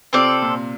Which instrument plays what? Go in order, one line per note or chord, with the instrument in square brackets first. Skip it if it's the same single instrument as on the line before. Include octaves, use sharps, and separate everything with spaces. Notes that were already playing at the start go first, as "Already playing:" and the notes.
[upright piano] C3 [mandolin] C4 F4 A4 D5
[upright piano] A#2